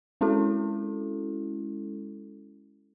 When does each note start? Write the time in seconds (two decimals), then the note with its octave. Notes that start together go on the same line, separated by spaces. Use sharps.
0.21 G#3 C#4 E4 F#4 A4